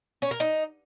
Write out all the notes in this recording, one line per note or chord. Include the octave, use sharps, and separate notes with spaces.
C#4
A#4
D#4